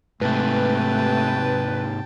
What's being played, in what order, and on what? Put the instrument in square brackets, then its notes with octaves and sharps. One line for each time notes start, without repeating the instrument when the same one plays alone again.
[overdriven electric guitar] G#2 C3 [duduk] A3 [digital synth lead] B4 [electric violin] G5 A5